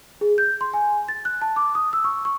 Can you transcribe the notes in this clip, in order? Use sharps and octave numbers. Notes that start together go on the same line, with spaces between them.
G#4
G6
C6
G#5
A6
F#6
A5
D6
D#6
E6
C#6
C#6